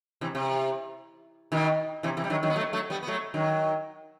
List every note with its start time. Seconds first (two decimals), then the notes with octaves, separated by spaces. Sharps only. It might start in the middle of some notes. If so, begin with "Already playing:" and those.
0.21 C3 E3
0.35 C3
1.52 B2 D#3
2.03 C3 E3
2.17 C3 E3
2.24 G3
2.30 D#3 F#3
2.43 D#3 F#3
2.50 B3
2.56 F#3 A3
2.73 F#3 A3
2.90 G3 B3
3.03 B3
3.07 F#3 A3
3.34 D#3 F#3